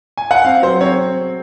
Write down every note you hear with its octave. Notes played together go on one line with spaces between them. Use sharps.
G#5
F#5
C4 F5
F#3 C5
C4 C#5